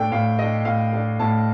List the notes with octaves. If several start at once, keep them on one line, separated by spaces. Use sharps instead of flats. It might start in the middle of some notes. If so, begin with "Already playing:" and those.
Already playing: A2 A3 D4 G5
A2 F5
A3 D4 D#5
A2 F5
A3 D4
A2 A5